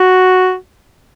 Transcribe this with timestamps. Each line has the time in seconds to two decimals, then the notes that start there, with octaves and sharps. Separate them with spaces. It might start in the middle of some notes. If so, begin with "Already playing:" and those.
Already playing: F#4